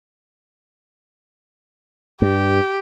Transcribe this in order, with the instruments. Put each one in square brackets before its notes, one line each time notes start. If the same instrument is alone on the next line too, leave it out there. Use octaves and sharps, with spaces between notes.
[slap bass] G2 [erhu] G4